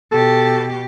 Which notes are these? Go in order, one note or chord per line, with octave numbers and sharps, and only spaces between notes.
B2 G4 A4